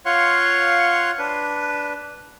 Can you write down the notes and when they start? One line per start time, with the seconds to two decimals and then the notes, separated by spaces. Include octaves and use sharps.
0.06 F4 C#5 F5 F#5 C6 C#6
1.18 D4 B4